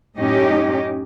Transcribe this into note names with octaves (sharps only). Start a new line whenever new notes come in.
F#2 A2 C#4 D#4 G4 D#5